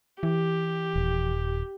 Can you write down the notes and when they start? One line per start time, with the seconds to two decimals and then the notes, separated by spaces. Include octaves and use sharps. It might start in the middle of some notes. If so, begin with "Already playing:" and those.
0.23 E3 G4
0.96 D#1